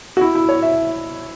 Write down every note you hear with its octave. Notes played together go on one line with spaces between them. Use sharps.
F#4
E4
E4
C#5
E5